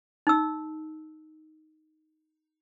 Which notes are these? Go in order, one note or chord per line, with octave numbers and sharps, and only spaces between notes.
D#4 E6